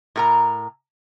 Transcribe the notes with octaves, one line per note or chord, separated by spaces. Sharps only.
A2 A#4 A#5